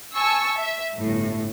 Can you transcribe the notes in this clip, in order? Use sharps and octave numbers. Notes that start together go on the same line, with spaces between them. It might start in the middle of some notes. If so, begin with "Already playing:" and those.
G#5 A5 C#6 E6
E5
G1 A2